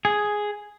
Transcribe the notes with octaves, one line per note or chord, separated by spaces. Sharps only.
G#4